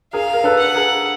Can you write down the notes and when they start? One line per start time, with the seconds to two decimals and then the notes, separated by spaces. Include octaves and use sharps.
0.13 G#4 A#4 F5
0.34 A#4
0.44 A4 B4
0.60 F#5
0.75 G#4 A#4